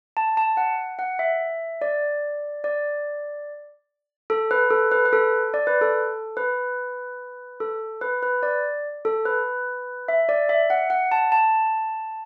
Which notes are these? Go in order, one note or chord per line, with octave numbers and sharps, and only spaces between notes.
A5
A5
F#5
F#5
E5
D5
D5
A4
B4
A4
B4
B4
A4
D5
B4
A4
B4
A4
B4
B4
D5
A4
B4
E5
D5
E5
F#5
F#5
A5
A5